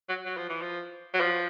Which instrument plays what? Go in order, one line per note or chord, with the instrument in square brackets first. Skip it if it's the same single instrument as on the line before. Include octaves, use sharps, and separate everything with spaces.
[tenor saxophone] F#3
F#3
F3
E3
F3
F#3
F3